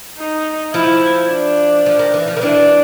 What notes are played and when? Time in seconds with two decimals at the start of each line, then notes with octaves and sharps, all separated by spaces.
0.18 D#4
0.74 F3 E4
1.29 D4
1.86 F3
1.99 D#3
2.14 E3
2.28 F3
2.37 D#3
2.41 E3 D4